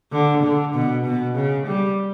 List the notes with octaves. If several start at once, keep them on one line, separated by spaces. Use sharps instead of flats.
D3
D3
B2
B2
C#3
G3